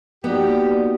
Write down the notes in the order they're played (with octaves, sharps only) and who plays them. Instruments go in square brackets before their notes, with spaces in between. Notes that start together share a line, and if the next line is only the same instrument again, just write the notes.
[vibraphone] A#3 F#4 D5 [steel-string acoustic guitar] B3 D#4 [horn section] G4